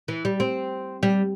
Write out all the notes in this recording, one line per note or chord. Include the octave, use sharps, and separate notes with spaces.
E3
G3
C4
G3